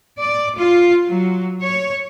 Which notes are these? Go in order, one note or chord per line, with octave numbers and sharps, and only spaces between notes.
D5
F4
F#3
C#5